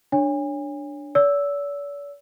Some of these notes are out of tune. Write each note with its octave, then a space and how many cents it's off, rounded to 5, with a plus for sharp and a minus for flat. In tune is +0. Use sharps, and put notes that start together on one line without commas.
D4 +0 C#5 +10 G#5 -35
D5 -45 E6 +0